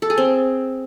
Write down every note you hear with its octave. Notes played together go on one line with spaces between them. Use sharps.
A4
G#4
C4